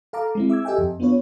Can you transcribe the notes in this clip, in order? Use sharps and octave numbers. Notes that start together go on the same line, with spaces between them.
A4 F5 A5 A#5 D6
G#3 C4 E4
E5 D6 E6 G#6
G4 A4 D#5 E5 G5 G#5
F2
B3 D4 F4 B4 C#5